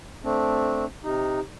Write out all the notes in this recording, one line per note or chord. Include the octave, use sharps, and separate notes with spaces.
A3 C4 D4
C3 D#4